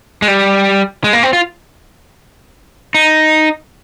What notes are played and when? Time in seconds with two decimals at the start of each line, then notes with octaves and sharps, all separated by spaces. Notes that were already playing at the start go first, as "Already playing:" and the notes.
0.22 G#3
0.28 G3
1.04 G#3
1.13 A#3
1.23 C4
1.33 F4
2.95 D#4